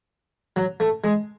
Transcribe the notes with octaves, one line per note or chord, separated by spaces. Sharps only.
F#3
A3
G#3